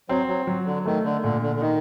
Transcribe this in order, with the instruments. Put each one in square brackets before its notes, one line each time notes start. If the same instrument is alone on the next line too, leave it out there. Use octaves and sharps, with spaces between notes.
[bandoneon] F#3 [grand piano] C4
[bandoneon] F#3
[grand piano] F#3
[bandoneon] D3
[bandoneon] D#3 [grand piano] A3
[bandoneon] D3
[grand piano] A#2 [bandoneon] D3
[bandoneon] D3
D3
[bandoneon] D#3 [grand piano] D#4